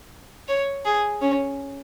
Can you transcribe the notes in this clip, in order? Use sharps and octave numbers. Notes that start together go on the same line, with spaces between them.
C#5
G#4
C#4